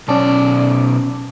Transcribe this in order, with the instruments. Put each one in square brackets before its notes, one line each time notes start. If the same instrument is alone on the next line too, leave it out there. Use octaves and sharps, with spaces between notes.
[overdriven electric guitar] B1 D5 [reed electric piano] C#4 A5